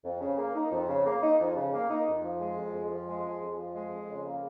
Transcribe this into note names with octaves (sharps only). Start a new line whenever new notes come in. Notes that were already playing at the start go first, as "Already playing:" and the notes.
F2
C#3
A#3
D#4
F2
C#3
A#3
D#4
F2
C#3
A#3
D#4
F2
F3
G#3
F2
F2
F3
G#3
F2
F2
F3
G#3
F2
C#3
A#3